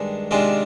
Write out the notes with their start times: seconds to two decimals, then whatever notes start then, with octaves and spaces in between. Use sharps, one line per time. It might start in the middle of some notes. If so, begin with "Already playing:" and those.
Already playing: G2 D#3 G#3 D4
0.31 C3 D#3 G#3 D4 F4